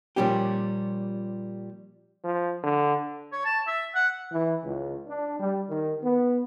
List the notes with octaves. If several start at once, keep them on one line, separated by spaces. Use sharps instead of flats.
A#2 F3 G3 C#4 G4
F3
D3
C#5
A5
E5
F#5
E3
C#2
D4
G3
D#3
B3